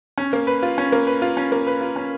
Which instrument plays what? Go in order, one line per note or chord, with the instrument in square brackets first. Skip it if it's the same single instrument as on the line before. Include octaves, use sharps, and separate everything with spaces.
[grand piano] C#4
A#3
B4
F4
C#4
A#3
B4
F4
C#4
A#3
B4
F4
C#4